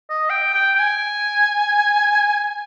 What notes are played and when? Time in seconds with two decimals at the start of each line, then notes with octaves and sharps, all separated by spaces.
0.10 D#5
0.30 G5
0.55 G5
0.75 G5
0.80 G#5